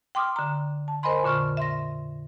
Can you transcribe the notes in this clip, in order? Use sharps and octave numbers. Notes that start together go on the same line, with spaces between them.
G5 C6 D6 D#6 F6
D3 A#5
A5
A#4 C5 D#5 G#5 B5 C6
F2 A#2 D3 C#6 F6
E5 C6 A#6